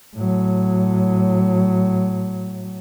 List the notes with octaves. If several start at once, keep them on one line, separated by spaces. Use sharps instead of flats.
A2 F#3